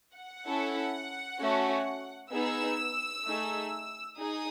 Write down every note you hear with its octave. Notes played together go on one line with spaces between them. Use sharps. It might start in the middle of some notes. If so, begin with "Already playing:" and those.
F#5
C#4 E4 A4
A3 C#4 F#4
B3 D#4 G#4 E6
A3 D#4 G#4
D#4 G#4 D#6